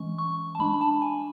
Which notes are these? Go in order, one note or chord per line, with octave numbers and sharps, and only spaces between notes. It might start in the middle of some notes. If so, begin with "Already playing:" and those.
Already playing: E3 G#3 C#4 C#6
C#6
A5
G#3 D4 B5
B5
A5
G#5